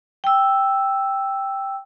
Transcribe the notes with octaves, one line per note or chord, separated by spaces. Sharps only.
G5 E6